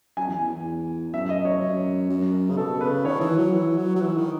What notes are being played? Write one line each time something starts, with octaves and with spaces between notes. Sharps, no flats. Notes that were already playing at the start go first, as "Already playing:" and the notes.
F#2 G#5
E2
E2
F#2 E5
D#5
C#5
F#2
F#2
C#3
B2 A4
C#3 B4
D#3 C#5
E3
F#3
E3
F#3
F#3
E3
D#3